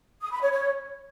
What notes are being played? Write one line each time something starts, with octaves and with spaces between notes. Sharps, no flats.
D#6
B5
C#5
C#5